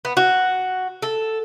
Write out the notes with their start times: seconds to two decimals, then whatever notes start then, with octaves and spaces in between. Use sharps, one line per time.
0.05 B3
0.17 F#4
1.02 A4